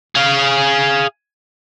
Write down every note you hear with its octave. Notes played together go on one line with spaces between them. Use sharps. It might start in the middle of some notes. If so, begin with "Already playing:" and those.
G#4 F5